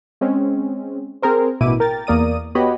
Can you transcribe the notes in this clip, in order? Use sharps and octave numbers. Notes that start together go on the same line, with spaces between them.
G#3 C4 C#4
C4 G#4 A#4 C5
A1 B2 E4 D6 D#7
A#4 G5 A6
E2 A#3 A#4 D5 D#6 D#7
B3 F#4 G4 C#5 D#5 B5